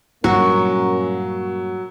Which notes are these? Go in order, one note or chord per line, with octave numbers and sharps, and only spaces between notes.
G2 A#2 F#3 A#3 C#4 F#4 A#4